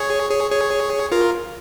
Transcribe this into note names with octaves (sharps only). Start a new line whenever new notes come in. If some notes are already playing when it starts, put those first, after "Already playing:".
Already playing: G#4 C#5
G#4 C#5
G#4 C#5
F4 A#4